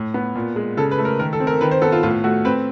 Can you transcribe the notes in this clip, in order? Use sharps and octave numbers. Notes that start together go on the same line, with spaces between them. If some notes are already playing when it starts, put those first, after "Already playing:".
Already playing: A2
B3
A#2
G#3
C#3 A4
B4
A3
A#4
D#3 A#4
A4
C4
A#4
D#3 B4
C5
B3 A4
F4
A2 F4
A3 F#4
C4 B4